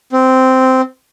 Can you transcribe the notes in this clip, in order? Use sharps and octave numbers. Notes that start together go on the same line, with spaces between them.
C4